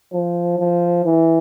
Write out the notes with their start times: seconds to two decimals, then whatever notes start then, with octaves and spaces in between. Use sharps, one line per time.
0.13 F3
0.59 F3
1.05 E3